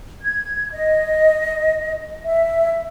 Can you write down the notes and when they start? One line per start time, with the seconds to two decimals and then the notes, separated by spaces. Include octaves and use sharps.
0.21 G#6
0.72 D#5
2.25 E5